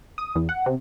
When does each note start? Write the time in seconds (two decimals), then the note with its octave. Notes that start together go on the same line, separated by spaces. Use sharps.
0.18 D#6
0.36 E2
0.49 F#5
0.66 C3